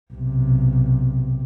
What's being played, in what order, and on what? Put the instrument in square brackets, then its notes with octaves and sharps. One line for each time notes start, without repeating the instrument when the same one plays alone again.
[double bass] B1 C3